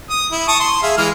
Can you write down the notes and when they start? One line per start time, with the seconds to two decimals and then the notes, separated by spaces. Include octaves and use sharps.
0.10 D#6
0.31 E4
0.48 A5 C#6 D#6
0.60 C6
0.83 G#4 E5 F5
0.97 E3 G#3 F6